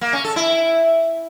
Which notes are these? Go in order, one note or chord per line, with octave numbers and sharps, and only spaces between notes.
A#3
C#4
A4
E4